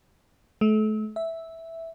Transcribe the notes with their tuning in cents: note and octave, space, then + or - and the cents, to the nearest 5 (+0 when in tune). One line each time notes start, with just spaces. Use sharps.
A3 -35
E5 -5